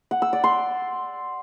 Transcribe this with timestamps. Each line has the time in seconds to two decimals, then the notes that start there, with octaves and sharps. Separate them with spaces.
0.11 F#5
0.22 E6
0.33 D5
0.44 C6